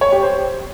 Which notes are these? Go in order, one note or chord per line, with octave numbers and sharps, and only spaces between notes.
C#5
G4
C5